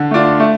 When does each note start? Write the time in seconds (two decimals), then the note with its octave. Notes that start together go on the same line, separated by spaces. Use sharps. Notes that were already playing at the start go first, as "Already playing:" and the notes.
Already playing: D3
0.11 A3 D4 F4
0.40 A3